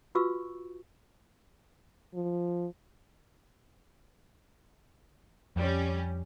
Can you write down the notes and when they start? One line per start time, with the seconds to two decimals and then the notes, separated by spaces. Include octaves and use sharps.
0.15 F4 F#4 B4 F5 C#6 E6
2.14 F3
5.56 F2 G3 C#4